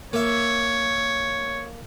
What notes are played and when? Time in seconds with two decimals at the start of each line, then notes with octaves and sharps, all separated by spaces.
0.13 A#3 C#5 E5